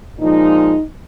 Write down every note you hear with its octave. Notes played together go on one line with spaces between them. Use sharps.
A#2 F3 G#3 D#4